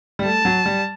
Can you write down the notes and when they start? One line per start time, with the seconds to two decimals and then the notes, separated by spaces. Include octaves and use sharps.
0.19 G3
0.25 A3 A5
0.45 F#3
0.66 G3